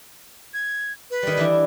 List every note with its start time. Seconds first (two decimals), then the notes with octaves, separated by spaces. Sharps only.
0.54 G#6
1.11 B4
1.23 D#3 G3
1.38 E3 D4 E4